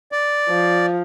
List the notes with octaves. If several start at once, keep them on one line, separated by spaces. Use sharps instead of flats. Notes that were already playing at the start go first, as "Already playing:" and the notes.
D5
F3